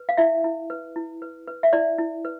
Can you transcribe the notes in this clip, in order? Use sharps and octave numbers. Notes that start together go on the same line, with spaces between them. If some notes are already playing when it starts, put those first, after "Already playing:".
Already playing: B4
F5
E4 E5
E4
B4
E4
B4
B4
E5
E4 D5
E4
B4